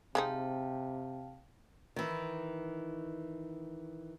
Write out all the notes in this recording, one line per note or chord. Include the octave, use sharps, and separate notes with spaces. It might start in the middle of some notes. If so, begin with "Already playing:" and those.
C3 G#3 C4 D#4 F5 G5 A5
D#3 E3